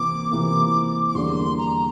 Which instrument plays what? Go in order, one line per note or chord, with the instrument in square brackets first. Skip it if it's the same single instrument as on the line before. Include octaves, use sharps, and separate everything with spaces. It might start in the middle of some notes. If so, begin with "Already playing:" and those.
Already playing: [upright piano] C3 E3 A#3 [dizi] D6
[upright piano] C3 E3 A#3
[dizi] D6
[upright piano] E2 D3 G3 A#3 D4 [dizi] C6
[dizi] A#5